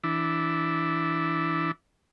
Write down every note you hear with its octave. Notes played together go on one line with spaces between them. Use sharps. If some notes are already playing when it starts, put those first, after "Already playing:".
E3 D4 E4